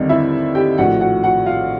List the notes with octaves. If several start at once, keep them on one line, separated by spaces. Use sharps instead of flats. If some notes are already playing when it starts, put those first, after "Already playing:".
Already playing: D#2 D3 G3 C4 D#4
E4 E5
G4 G5
A#1 A2 F3 F#4 F#5
F#4 F#5
F#4 F#5
F4 F5